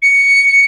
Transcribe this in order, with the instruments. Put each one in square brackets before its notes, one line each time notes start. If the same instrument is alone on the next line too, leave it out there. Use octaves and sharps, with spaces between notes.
[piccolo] C#7